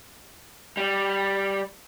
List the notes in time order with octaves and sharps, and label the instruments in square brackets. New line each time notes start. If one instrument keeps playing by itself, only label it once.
[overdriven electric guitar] G3